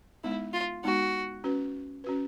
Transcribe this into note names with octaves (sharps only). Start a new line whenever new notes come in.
G#3 B3 D#4 E4
F4
G#3 B3 D#4 F#4
C#4 F#4 B4
C#4 F#4 B4